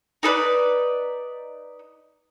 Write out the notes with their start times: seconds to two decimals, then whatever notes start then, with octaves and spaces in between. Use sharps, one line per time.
0.23 D#4 A4 B4 D5